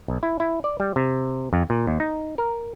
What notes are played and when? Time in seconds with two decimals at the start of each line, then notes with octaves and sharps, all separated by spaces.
0.08 B1
0.23 E4
0.40 E4
0.64 D5
0.80 G3
0.96 C3
1.53 F2
1.70 A#2
1.87 D#2
2.00 D#4
2.38 A#4